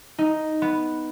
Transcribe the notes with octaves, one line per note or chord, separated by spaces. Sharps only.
D#4
B3